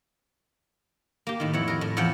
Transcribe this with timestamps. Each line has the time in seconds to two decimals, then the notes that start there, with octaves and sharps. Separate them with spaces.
1.27 A#3 G4
1.40 A2 D#3
1.53 F2 E4 C#5 F#5
1.68 A#4 D#5
1.81 A2
1.97 E2 F3 C#5 F#5 G5